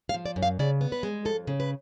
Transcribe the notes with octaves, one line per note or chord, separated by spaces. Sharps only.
F5
F3
D5
F#2
F5
C#3 D5
B3
B4
G#3
F2 A4
C#3
B4